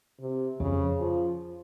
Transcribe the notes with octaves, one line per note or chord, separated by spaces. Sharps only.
C3
F2 C#3
F3